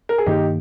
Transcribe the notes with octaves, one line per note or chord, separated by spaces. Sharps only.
A#4
G#4
G2 D#3 A#3 D#4 G4